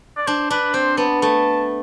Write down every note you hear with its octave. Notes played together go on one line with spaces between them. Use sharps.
D5
D4 C5
D4 B4
C4 C5
B3 A5
A3 A5